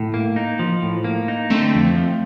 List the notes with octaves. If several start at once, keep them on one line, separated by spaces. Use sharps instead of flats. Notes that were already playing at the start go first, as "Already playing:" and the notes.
Already playing: A2
A#3
D#4
F3
A2
A#3
D#4
D3 A3 C4
F2
F3